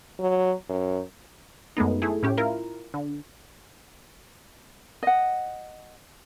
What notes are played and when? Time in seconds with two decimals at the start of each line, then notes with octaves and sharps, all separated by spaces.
0.20 F#3
0.69 F#2
1.77 F#2 G#3 A3 B3 D#4
2.02 A3 E4 G#4
2.23 A2 C#4 G4
2.37 E4 F4 A#4
2.94 D3
5.03 D#5 F#5